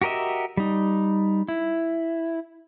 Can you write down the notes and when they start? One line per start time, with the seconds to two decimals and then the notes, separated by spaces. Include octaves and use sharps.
0.02 F#4 G4 A#4 D#5 E5
0.57 G3 D#4
1.48 E4